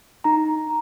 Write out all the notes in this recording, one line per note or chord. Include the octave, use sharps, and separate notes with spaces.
D#4 A#5